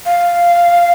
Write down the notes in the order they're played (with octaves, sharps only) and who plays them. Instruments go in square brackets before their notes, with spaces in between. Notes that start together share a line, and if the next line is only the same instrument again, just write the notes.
[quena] F5